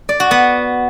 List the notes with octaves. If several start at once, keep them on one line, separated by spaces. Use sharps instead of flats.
D5
F#4
B3